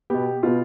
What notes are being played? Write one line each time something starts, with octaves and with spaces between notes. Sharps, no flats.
B2 B3 G4
B2 B3 F4